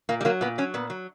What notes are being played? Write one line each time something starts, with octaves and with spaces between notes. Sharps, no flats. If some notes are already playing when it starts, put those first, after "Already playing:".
A#2 A#3
G3
F#3 A#3
A#2 B3
F#3 C#4
A#2 B3
F#3